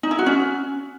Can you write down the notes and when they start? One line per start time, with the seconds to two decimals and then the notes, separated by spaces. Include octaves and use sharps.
0.03 D#4
0.11 E4
0.19 F#4
0.26 C#4